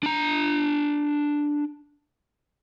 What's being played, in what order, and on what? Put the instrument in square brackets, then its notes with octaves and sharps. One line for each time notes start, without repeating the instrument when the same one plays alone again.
[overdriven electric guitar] D4 A#5